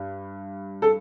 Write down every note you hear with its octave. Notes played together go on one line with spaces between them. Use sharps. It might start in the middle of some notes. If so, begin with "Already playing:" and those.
Already playing: G2 G3
A4